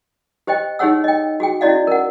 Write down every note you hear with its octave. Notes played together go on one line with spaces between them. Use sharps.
G4 C5 D#5 G5
D#4 G4 G#4 C#5 F#5 E6
D#5 G5
F#4 G#4 G5
C#4 E4 F#4 D5 D#5 F5
A#4 F#5